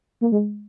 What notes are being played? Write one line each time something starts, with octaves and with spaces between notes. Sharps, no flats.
A#3
G#3